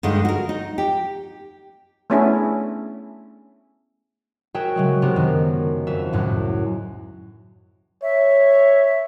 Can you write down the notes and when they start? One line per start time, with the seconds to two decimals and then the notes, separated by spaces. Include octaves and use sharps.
0.03 G2 D3 G#3 D#4
0.25 F#4 A#4
0.49 D#4
0.78 G4
2.10 A3 B3 C#4 D4 E4 G#4
4.54 F#4 G#4 A#4 C#5 E5 G5
4.76 C#3 F#3 G#3
5.02 C3 B3 D4 G4 A#4
5.16 F#2 D#3
5.87 F2 E5
6.13 C#2 F#2 A2
8.03 C#5 E5